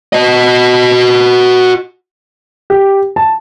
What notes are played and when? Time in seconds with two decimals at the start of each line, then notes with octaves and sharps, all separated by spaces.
0.13 F#4 D#5
2.70 G4
3.16 A5